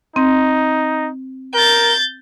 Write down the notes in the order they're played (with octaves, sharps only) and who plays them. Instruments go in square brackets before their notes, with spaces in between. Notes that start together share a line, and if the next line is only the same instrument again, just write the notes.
[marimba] C4 [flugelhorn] D#4
[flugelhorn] A#4 [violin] G6 A6